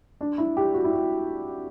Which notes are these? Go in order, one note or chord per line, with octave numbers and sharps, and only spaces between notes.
D4
E4
G4
F#4
E4
F#4